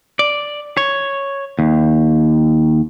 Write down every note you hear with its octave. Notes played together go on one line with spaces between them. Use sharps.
D5
C#5
D#2